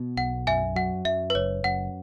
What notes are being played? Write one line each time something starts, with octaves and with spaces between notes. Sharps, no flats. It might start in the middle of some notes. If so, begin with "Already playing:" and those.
Already playing: B2 B3
B1 F#5
F#2 E5 G#5
F#3 F#5
F#2 E5
B4
F#1 C#5
F#2 F#5